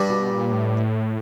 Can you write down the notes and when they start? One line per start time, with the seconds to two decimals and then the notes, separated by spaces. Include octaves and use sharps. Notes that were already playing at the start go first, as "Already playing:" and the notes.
Already playing: G2 G3
0.09 B2
0.30 A#2
0.52 A2